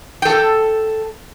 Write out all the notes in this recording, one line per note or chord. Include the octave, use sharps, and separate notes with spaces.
A4 G5